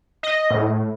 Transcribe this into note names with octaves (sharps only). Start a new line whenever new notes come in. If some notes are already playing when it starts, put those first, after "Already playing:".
D#5
A2